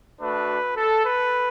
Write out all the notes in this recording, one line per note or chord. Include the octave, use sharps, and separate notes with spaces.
A3 D4 F#4 B4
A4
B4